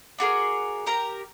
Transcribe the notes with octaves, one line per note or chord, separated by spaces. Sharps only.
D4 F#4 G#4 A#4
G4 A#4 A#5